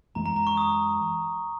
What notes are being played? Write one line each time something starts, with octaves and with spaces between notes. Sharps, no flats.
F#2 E3 G#3 A#5
A#5
A#5
C#6
D#6